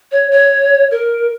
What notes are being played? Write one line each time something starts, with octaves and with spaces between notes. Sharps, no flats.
C#5
C#5
A#4